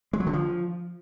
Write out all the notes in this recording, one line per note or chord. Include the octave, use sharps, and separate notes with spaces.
G#3
F#3
D3
F3